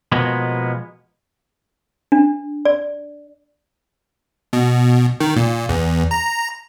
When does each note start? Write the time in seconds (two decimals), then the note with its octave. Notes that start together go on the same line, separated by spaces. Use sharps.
0.12 B2 F3 G#3 A#3 B3
2.12 D4
2.65 D5
4.53 B2
5.20 D#3
5.36 A#2
5.69 E2
6.11 A#5